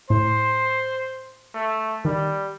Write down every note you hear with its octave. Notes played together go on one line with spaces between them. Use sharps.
A2 C5
A3
D#3 G3